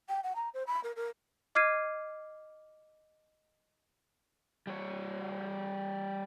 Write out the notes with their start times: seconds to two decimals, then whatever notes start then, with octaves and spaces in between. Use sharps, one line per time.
0.09 G5
0.24 F#5
0.35 A#5
0.54 C5
0.67 B5
0.84 A#4
0.96 A#4
1.55 D#5 D6 F6 G#6 C7 D#7
4.67 G3 C#5